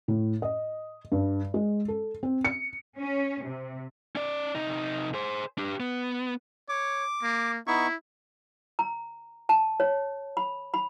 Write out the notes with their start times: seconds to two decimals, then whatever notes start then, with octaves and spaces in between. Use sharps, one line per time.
0.08 A2
0.42 D#5
1.12 G2
1.54 G#3
1.88 A4
2.23 C4
2.45 C#7
2.99 C#4
3.45 C3
4.16 C#4 D5
4.55 C3 D#4
5.14 G#4 C5
5.58 D4 G4
5.80 B3
6.69 C#5 D6
7.23 A#3
7.67 B3 D#4 E4 C#6
8.79 A#5
9.49 A5
9.80 C#5
10.37 B5
10.74 B5